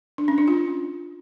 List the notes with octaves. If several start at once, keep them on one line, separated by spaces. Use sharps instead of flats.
D4
C#4
D4
F4